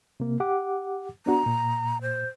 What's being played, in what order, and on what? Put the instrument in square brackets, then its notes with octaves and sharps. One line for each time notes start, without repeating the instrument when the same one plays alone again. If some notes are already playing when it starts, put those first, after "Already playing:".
[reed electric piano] C3 A#3
G4 F#5 D6
[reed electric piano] B3 D4 F#4 [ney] A#5
[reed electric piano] A#2
[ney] C5